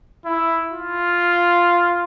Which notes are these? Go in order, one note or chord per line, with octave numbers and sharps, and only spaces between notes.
E4
F4